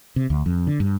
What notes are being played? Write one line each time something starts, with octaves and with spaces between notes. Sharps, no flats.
C3
D2
F2
D3
G2